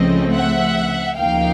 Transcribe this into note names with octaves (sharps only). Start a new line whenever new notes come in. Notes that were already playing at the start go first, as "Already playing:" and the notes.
Already playing: C#2 C#3 F3 A3 C4 D#5
E5 F#5
D2 C#3 F3 A#3 D#4 F5 G5